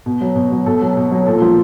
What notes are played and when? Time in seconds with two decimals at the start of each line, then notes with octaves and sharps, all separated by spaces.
0.06 B2
0.21 F#3
0.36 B2
0.51 F#3
0.66 B2 A4
0.81 F#3
0.96 B2
1.11 F#3
1.26 A#2 A4
1.42 F3